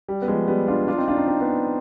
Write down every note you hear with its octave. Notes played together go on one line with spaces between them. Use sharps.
G3
B3
F3 G#3
G3 B3
D4 F4
D4 F4
C4 D#4
D4 F4
C4 D#4
C4 D#4
B3 D4